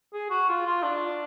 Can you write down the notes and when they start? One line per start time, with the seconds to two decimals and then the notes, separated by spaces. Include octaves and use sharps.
0.14 G#4
0.30 F#4
0.49 F4
0.67 F4
0.83 D4